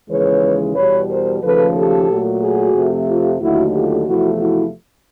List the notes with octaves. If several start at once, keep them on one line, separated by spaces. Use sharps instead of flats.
D#2 C#3 E3 G#3 B4 C#5
E2 B2 G3 B4 C#5
A#4 C5
D#2 C#3 F3 A3 A4 B4
G4 A4
A#2 F#3 A3
F#4 G#4
F2 C3 F3 A3
F4 G4
D#2 D3 F#3 A3 E4 F#4
F4 G4
E2 C3 F3 A3 E4 F#4
E4 F#4